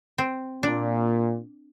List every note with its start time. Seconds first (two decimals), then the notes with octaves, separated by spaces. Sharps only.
0.18 C4
0.63 A#2 D4